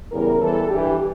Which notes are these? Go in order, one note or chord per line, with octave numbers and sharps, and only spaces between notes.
E2 C#3 E3 G3 A#4
E2 E3 G3 A4
G2 E3 G3 G4